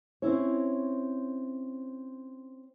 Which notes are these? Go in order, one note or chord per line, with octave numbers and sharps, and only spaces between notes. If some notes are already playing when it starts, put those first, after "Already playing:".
C4 C#4 E4 C#5